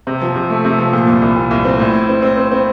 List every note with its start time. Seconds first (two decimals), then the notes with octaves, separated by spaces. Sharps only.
0.07 C3
0.22 F3
0.36 C3
0.50 A3
0.65 C3
0.78 F3
0.93 A#2
1.08 C2
1.22 C2
1.36 A#2
1.51 C2
1.65 C4
1.80 A2
1.94 E4
2.09 C4
2.22 C4
2.37 C4
2.52 C4